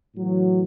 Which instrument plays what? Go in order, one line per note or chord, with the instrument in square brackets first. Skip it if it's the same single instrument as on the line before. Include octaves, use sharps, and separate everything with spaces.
[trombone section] A2 E3 F#3